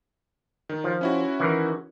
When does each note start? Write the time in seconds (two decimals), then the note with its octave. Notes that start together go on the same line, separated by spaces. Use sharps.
0.69 D#3
0.84 F3
1.01 C#4 E4 F#4
1.40 D#3 E3